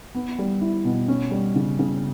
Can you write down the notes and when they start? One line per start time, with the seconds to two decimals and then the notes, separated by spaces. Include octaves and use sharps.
0.15 B3
0.38 G3
0.61 E4
0.85 B2
1.08 C#4
1.31 G3
1.56 C#3
1.79 C#3